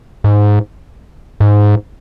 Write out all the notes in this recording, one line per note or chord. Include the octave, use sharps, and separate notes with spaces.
G#2
G#2